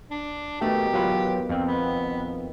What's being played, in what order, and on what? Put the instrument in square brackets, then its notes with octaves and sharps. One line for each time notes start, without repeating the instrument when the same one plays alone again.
[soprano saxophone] D4
[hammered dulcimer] B2 D#3 [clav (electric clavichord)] A3 [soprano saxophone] G4
[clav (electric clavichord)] F#3 F4 B4
F2 C4
[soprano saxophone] B3